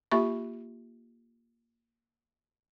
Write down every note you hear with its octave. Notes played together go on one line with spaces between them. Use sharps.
A#3 F4 G4 E5 B5 C#6